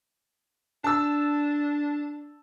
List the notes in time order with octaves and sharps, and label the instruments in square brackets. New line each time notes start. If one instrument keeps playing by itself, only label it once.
[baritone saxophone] D4 [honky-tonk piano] A5 E6